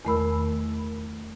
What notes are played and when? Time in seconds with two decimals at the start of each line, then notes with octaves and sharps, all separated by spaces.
0.05 E2 D#3 A3 A#4 B5 E6